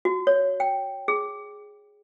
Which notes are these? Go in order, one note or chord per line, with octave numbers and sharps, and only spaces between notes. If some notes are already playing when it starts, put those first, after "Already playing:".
F#4
C#5
G5
G#4